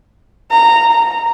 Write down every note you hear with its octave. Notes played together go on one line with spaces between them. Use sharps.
A#5
A#5